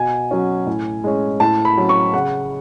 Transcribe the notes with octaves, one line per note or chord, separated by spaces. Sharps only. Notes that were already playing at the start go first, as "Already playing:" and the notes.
Already playing: B2 G#5
F#3 C#4
A2
G#3 C#4
A2 A5
B5
F#3 C#4
C#6
C#3 F#5